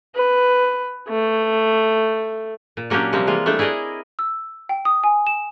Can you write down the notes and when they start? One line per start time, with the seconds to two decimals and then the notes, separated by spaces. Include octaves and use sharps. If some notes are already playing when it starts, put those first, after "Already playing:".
0.15 B4
1.08 A3
2.77 A#2
2.90 F#3 A#3 C#4 D4 G4
3.12 C3 F3 G3 A#3 C4
3.27 E3 G#3 A#3 F4
3.46 G3 A3 D4 E4 A4
3.59 E4 G#4 A#4 D5 D#5
4.19 E6
4.69 G5
4.85 D#6
5.04 G#5
5.27 E7